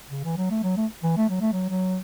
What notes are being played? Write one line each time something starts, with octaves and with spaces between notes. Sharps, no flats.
C#3
E3
F#3
A3
F#3
A3
E3
A3
F#3
A3
F#3
F#3